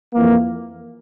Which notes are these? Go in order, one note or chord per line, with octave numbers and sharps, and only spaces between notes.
F2 E3 A#3